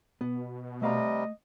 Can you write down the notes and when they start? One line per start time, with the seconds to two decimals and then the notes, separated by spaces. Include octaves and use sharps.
0.21 B2 B3
0.82 C3 G3 A3 D#5 F5 A#5